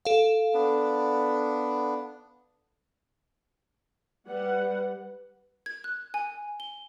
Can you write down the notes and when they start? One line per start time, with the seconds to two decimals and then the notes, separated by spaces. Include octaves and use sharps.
0.05 A4 F5
0.54 B3 D4
4.28 G3 B4 F#5
5.66 G#6
5.84 F#6
6.14 G#5
6.60 G7